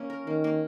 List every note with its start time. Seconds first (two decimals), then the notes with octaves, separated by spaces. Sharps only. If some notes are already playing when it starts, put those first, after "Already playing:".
Already playing: A#3 C#4
0.10 A#4
0.26 D#3 A#3
0.44 A#3